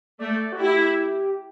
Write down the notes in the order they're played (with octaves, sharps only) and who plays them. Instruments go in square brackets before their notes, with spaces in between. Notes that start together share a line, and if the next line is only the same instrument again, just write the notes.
[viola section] A3 [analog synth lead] D5
[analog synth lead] F#4
[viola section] E4 [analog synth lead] G4